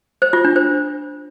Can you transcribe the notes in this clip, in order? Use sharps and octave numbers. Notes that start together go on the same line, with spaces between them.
C5
F4
D4
C5